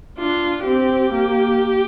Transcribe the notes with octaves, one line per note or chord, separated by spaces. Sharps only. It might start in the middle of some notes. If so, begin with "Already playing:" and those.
D4 F4
C4 G4
A#3